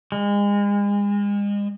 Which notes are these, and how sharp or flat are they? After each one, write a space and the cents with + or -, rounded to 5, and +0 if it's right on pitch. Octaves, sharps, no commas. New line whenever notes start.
G#3 -35